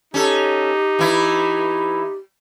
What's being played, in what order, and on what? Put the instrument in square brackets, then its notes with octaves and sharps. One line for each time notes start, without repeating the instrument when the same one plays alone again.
[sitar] C#4 A4 [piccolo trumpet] D#4 [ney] G4
[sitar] E3 E4